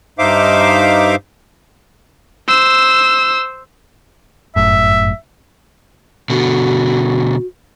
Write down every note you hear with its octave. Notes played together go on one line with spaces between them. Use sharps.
G2 D#4 C5 E5 F5 D6
C5 E6
G1 F#2 A2 E5
B2 D3 F#4